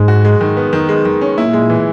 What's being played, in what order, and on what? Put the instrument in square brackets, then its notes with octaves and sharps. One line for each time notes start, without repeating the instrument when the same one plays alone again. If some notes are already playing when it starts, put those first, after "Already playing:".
Already playing: [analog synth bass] G#2 [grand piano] G#3
[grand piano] F#4
G#3
D#3
B3
D#3
G#3
D#3
C#4
[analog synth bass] A#2 [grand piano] E4
[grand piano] G#3
E3